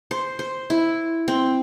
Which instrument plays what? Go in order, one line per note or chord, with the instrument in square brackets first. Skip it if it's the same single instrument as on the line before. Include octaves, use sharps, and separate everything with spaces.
[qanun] C5
C5
E4
C4